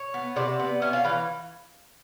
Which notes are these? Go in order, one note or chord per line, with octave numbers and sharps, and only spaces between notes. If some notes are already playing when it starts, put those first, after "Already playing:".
Already playing: C#5
B3
C3 D5
B3
C#4 E5
F5
E3 F5